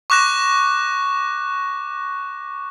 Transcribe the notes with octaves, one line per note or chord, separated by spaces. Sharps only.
C#6 D6 F#6 A#6 E7